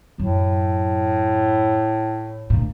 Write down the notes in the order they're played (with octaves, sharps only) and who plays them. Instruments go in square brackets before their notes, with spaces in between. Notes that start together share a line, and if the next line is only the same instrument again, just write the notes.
[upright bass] F#2 F#3 [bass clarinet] A2
[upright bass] D2 A#2